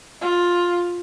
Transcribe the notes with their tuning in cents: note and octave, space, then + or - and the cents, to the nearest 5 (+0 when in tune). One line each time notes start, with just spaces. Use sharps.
F4 +10